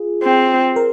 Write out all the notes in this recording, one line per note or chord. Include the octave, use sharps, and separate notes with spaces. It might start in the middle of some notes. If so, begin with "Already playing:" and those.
Already playing: F4 G#4
C4
A#4